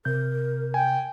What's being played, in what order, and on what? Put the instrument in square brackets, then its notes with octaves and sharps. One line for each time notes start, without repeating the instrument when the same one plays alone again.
[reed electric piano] C3 G6 [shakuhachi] A#4
[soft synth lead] G5 [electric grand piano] G#5